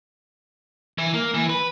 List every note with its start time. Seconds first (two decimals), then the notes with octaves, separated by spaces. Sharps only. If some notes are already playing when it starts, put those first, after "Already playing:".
0.98 E3
1.14 A#3
1.34 E3
1.49 B4